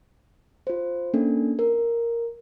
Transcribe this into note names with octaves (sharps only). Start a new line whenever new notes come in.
F4 C5
A#3 C#4 D4 A4
A#4